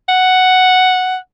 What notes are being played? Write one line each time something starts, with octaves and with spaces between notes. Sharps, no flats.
F#5